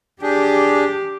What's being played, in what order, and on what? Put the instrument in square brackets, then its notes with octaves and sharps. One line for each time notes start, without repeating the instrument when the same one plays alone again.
[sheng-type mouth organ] D4 G#4 [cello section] G4